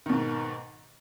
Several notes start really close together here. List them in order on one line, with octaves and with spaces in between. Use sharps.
D#3 B2 G#2